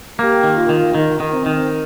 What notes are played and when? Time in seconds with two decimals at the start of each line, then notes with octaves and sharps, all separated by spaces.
0.18 A#3 G4
0.44 D#3
0.56 F4
0.69 D#3
0.95 D#3 D#4
1.20 D#3
1.33 C4
1.46 D#3